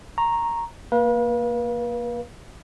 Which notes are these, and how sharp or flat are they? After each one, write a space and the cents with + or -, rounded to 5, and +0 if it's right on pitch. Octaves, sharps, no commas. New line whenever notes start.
A#5 +0 C#6 -25
A#3 +0 B4 -40 F5 +0